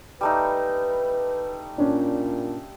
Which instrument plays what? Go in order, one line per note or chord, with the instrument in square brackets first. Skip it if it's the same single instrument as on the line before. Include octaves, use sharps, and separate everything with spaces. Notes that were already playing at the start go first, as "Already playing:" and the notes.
[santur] G3 A3 D#4 [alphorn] B4
[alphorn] A#2 [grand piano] C#4 D4